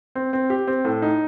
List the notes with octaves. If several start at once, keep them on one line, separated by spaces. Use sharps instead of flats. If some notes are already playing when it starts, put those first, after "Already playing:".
C4
C4
G4
C4
A2
D#4